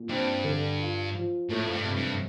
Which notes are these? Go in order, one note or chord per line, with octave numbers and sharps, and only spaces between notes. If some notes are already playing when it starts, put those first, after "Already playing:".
Already playing: A#2
G2 C4
D3
F4
F3
A2 A3
F2
G2
C3
G2